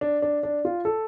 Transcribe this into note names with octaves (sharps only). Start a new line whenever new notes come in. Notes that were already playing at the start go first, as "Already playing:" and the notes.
D4
D4
D4
F4
A4